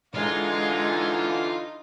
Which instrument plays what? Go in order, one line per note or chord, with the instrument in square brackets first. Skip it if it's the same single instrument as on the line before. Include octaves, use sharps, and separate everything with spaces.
[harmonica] D3 E3 F5 [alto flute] G#3 [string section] D#4 [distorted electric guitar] F4